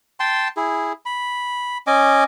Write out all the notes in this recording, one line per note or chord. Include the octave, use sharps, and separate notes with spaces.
G5 A5 C6
E4 G#4
B5
C#4 D#5 G#5 D6